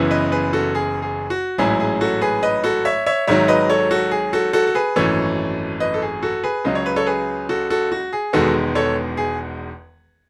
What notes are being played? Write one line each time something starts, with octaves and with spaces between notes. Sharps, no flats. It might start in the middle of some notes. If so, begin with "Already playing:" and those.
Already playing: F#1 F#2 E3 B3 E4
B4 D#5
G#4 B4
F#4 A4
G#4
G#4
F#4
A1 G#2 F#3 C#4 E4 G#4
G#4
F#4 A4
G#4 B4
B4 D#5
F#4 A4
C#5 E5
C#5 E5
G#1 G#2 D#3 F#3 C#5 E5
B4 D#5
A4 C#5
F#4 A4
G#4
F#4 A4
F#4 A4
A4
G#4 B4
G#1 F#2 E3 A3 A4 C#5
B4 D#5
A4
G#4
F#4 A4
G#4 B4
C#2 C#3 F#3 D#5
C#5
B4
A4 C#5
G#4 B4
F#4 A4
F#4 A4
F#4
G#4
E1 E2 D#3 G#3 B3 F#4 A4
A4 C#5
G#4